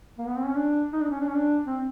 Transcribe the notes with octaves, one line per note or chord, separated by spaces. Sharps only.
A#3
B3
C4
C#4
D4
D#4
D4
C#4
D4
C#4
D4
C4